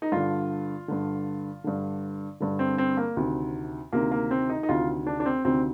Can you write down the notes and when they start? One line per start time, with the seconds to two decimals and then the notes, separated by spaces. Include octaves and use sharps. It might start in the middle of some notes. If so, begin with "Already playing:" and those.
0.02 D#4
0.12 G2 D3 F4
0.88 G2 D3
1.64 G2 D3
2.40 G2 D3
2.59 C4
2.78 C4
2.97 A#3
3.17 D2 C3 D#3
3.92 D2 C3 D#3 A#3
4.12 A#3
4.31 C4
4.49 D#4
4.63 D#4
4.69 D2 C3 D#3 F4
5.07 D4
5.20 D4
5.26 C4
5.45 D2 C3 D#3 C4